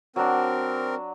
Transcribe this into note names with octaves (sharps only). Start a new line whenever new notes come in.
F#3 C4 D4 A#4